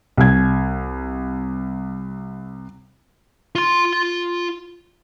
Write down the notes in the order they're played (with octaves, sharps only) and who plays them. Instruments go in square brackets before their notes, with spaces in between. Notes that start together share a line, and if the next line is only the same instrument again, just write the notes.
[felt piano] C2 G#6
[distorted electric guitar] F4 C6